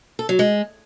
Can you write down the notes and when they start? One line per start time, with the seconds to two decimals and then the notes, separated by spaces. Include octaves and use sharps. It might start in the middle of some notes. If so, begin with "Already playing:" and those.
0.19 A4
0.29 F#3
0.39 G#3